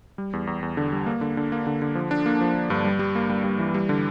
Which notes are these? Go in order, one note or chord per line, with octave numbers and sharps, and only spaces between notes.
G3
E2
E2
E2
D3
G3
A#3
D3
D3
A#3
D3
D3
F3
D4
A#3
F3
A#3
G2
G3
G3
A#3
G3
G3
E3
G3
D3